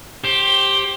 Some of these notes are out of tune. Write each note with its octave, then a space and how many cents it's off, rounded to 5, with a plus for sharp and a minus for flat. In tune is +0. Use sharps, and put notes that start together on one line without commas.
G4 +0 C5 +25